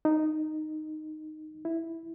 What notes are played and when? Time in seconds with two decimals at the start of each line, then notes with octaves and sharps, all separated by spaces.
0.05 D#4
1.65 E4